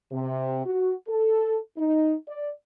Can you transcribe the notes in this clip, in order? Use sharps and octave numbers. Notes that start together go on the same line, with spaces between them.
C3
F#4
A4
D#4
D5